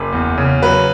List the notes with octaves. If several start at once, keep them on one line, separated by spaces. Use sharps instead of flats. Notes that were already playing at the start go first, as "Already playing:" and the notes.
Already playing: F#1
E2
C#3
F#3 B4